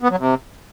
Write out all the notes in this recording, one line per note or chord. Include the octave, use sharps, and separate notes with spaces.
B3
F#3
C3